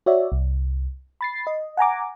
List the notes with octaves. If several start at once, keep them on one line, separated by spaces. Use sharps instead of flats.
F#4 C#5 D5 E5
C2
B5 A6 C7
D#5
F#5 G#5 A#5 D6